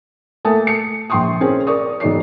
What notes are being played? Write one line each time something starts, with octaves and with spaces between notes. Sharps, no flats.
A3 A#3 G#5 A5 D#6
C#7
A#1 G5 C6 C#6 D#6
C4 C#4 G#4 A#4
A#4 D5 C#6 D#6
E1 G#2 F#3 D5 C7